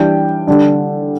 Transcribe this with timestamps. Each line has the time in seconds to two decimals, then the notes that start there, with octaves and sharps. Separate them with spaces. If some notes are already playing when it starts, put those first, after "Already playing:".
Already playing: E3 G3 D4 G5
0.47 D3 G3 D4